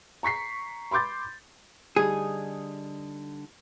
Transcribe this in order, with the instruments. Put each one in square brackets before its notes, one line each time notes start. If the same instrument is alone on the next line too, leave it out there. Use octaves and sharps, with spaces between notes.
[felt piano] A#5 C#6 B6 C7
B5 C6 D6 G6 A6
[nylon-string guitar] D3 G3 D#4 [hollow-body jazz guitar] G#4